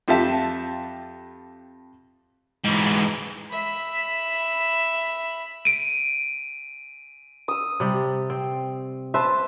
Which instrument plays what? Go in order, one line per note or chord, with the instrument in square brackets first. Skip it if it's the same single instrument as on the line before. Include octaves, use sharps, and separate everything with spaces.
[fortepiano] F2 F4 G4 E5 A5
[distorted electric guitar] G#2 E3
[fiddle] E5 B5
[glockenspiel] D7 D#7
[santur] D#6 E6
[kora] C3 G3
C4
[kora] B4 E5 [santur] C5 A5